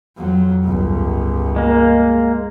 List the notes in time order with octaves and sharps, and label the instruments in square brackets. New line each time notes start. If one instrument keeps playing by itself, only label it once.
[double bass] F2 F#3
G1 C#2
[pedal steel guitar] G#3 A#3